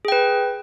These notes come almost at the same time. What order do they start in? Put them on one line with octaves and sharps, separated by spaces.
G#4 G5 B4